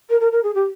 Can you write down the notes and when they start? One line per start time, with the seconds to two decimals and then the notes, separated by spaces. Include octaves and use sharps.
0.09 A#4
0.20 A#4
0.31 A#4
0.43 G#4
0.54 G4